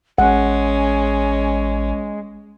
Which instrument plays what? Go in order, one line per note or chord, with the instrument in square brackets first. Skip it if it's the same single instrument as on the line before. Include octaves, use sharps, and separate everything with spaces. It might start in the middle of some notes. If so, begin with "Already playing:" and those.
[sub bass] A1 [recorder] G#3 [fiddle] C#4 [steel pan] F#5